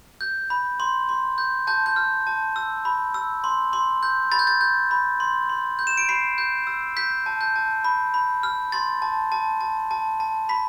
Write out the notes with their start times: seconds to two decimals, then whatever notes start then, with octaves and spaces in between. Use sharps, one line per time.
0.21 G6
0.50 B5
0.80 C6
1.09 C6
1.38 G6
1.67 A5 G6
1.86 G6
1.96 F6
2.27 A5
2.56 E6
2.85 B5
3.14 E6
3.44 C6
3.73 C6
4.03 G6
4.32 B5 A6
4.39 G6
4.47 A6
4.61 G6
4.91 B5
5.20 C6
5.49 C6
5.79 G6
5.87 E7
5.97 D7
6.09 B5 C7
6.38 G6
6.67 E6
6.97 G6 B6
7.26 A5
7.41 G6
7.56 A5
7.85 B5
8.14 B5
8.43 F6
8.72 C6 A6
9.02 A5
9.32 A5
9.61 A5
9.91 A5
10.20 A5
10.49 B5 B6